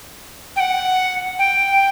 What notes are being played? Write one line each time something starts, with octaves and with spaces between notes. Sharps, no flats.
G5
F#5
G5